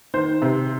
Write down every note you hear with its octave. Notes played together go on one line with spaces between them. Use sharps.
D#3 C5
C3